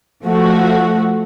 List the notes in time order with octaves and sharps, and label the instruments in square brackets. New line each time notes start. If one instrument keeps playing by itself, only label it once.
[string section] F3 A3 F#4